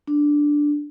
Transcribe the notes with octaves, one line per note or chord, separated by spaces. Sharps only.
D4